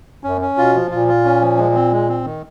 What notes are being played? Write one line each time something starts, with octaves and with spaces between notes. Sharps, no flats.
F#2 C#4
C#4
B2 F4
F3
A#2 F4
F4
C#4
F3
G#3
C4
G#3
C4
D#3